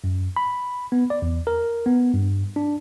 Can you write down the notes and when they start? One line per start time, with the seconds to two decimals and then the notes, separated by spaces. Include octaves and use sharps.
0.04 F#2
0.36 B5
0.92 B3
1.10 D5
1.22 E2
1.47 A#4
1.86 B3
2.14 G2
2.56 D4